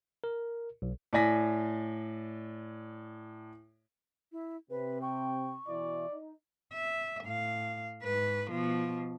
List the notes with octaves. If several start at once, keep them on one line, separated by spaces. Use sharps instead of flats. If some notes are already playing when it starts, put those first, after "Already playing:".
A#4
B1
A2 D5 G#5 A#6 B6
E4
C3 C4 B4
G5 C#6
B2 E3 E4 D5
D#4
E5
A2 F5
G#2 B4
B2 F3